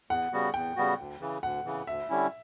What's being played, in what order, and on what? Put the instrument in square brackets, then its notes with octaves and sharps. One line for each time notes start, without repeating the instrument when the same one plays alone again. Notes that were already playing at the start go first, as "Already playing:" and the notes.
[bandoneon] E2 [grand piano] F#5
[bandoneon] C#3 G3 B3 F#4
[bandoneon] E2 [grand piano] G5
[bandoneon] C#3 G3 B3 F#4
D2
C#3 E3
[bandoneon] D2 [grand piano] F#5
[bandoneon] C#3 E3
[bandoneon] D2 [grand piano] E5
[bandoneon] D3 G3 C#4 E4